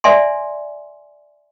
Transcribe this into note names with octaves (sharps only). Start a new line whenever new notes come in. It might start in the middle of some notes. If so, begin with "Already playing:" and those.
D5 E5 G#5 C6